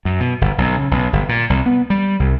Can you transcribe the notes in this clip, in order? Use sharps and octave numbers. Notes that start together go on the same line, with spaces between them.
F#2
B2
G1
B1
C#3
B1
G1
A#2
C2
B3
G3
C2